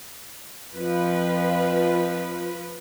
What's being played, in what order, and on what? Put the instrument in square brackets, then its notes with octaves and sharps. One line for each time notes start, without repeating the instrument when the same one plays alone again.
[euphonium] F2 [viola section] F3 B4